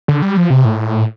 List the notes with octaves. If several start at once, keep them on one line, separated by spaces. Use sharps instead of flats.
D3
G3
F3
C3
A2